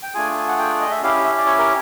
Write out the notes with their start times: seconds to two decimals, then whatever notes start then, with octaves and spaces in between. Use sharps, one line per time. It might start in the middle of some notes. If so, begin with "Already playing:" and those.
0.03 G5
0.14 A3 D4 F4 G#4 G#5
0.48 F#5
0.59 G5
0.80 D#5
0.91 E5
1.02 C#4 E4 G4 F5
1.24 E5
1.38 D5
1.46 C#5
1.59 A#4